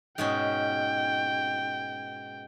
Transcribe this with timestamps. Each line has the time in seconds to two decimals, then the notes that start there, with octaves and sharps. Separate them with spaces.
0.18 G#2 B2 C#4 G5